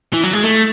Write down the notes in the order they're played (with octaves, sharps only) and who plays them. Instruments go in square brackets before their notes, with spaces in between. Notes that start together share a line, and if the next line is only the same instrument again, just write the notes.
[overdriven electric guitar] E3
F#3
G#3
A3